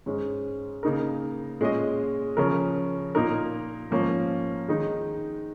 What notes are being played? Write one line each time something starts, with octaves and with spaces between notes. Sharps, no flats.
G#2 G#3 C#4
C#3 A#3 D#4 A#4
A#2 G#3 C#4 G#4 D#5
C#3 F3 C#4 A#4
A#2 A#3 D#4 A#4
G#2 F3 A#3 C#4
D#3 G#3 D#4